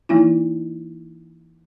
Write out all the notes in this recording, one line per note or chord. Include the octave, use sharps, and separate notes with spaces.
E3 A#3 D#4 E4